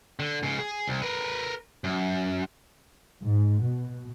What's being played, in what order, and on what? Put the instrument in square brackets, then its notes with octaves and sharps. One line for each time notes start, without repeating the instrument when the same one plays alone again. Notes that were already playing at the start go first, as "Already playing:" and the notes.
[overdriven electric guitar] D3
G#2 C#3
G#4
C2
A#4 B4
F#2
[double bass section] G#2
B2